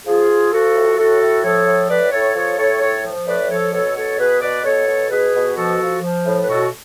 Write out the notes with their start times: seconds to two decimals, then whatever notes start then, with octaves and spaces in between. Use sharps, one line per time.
0.06 F3 F4 G#4
0.28 F3
0.51 F3 F#4 A4
0.75 A2
0.97 A2 F#4 A4
1.20 A2
1.43 F3 A4 C#5
1.66 A2
1.89 A2 B4 D5
2.12 A2 A4 C#5
2.35 F3 A4 C#5
2.58 A2 A4 C#5
2.81 A2 A4 C#5
3.04 F3
3.26 A2 B4 D5
3.50 F3 A4 C#5
3.72 B2 A4 C#5
3.95 B2 A4 C#5
4.18 B2 G#4 B4
4.41 B2 B4 D5
4.64 B2 A4 C#5
4.87 B2
5.10 B2 G#4 B4
5.34 B2
5.55 F3 F#4 A4
5.79 F3
6.01 F3
6.25 A2
6.43 B4
6.47 B2 F#4 A4